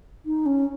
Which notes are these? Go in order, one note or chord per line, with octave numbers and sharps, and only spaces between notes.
D#4
C#4